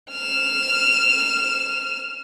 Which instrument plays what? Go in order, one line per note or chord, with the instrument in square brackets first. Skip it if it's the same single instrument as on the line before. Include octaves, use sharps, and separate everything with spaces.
[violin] F6 E7